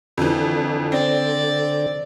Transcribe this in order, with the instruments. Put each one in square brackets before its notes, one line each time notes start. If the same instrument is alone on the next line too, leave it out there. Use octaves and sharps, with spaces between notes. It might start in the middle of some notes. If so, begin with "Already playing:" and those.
[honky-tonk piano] F2 E3 [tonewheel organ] D3
[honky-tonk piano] C4 [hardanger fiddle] D5